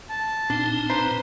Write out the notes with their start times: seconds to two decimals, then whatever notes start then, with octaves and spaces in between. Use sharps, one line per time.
0.09 A5
0.50 A#2 C4 D4 D#4
0.90 B4 C5 A#5